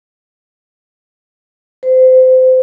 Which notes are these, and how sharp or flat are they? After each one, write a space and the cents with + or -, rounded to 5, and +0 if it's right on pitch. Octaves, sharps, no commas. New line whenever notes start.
C5 -25